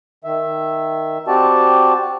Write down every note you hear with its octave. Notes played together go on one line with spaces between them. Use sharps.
D#3 E5
C4 F#4 G4 D5 A5